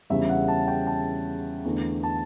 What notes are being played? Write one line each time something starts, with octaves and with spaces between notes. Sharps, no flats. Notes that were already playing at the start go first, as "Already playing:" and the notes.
E2 C#3 G3 D4 E5
F#5
A5
G5
A5
E2 D3 A3
A5